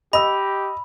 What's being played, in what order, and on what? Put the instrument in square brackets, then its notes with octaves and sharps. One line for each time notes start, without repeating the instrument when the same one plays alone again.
[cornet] G4 [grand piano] D#5 E6 [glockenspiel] B5